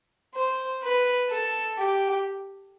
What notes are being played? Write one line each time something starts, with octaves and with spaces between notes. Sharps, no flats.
C5
B4
A4
G4